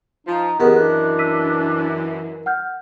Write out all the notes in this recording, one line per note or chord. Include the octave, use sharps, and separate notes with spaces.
F3 D#4
F#2 D#3 E3 B3 G4 G#4
D4 F#6
E6 B6 D#7
F#5 F6 G6